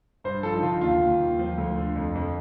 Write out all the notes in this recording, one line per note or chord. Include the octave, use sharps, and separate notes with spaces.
G2 C5
F3 A4
D#4
D3 F4
D#2 F4
D#2
D#2
F3
D2
D3
F2
F2